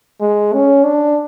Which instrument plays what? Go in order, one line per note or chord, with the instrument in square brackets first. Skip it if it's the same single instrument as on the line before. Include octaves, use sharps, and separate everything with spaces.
[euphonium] G#3
C#4
D4